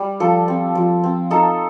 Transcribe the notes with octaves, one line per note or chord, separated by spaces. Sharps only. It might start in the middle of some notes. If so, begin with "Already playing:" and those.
Already playing: G3
F3 A4
C4
F3
C4
D#4 A4